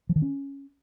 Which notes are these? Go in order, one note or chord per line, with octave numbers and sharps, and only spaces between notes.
F3
D#3
C#4